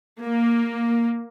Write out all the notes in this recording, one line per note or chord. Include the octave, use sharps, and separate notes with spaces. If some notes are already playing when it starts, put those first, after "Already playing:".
A#3